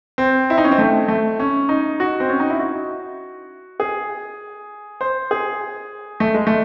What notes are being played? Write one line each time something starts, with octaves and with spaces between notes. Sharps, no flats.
C4
E4
D#4
C#4
C4
A3
A3
C#4
D#4
F#4
C4
C#4
D#4
E4
F#4
G#4
C5
G#4
A3
G#3
A3